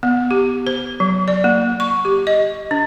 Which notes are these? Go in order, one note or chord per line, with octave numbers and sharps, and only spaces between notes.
B3
G4
C5
F#3
D5
A#3
C#6
G4
D#5
D4